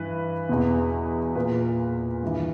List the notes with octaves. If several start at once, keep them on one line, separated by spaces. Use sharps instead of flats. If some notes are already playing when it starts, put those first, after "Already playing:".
Already playing: G2 E3 B4
E2 B2
A#2 B4
G2 E3